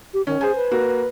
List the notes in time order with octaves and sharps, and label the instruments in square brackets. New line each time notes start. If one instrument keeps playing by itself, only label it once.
[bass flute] G4
[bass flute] D#3 [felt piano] C#4
[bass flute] G#4 [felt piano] C5 G#5
[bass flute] B4
[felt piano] A#3 F#4